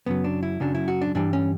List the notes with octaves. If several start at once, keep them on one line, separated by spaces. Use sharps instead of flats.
F#2 C#3 F#3 B3
D4
E4
F#2 C#3 F#3 D4
E4
F#4
D4
G2 E3 G3 D4
C#4